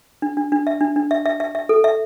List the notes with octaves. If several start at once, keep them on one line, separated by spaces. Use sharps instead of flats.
D4
D4
D4
E5
D4
D4
E5
E5
E5
E5
A4
E5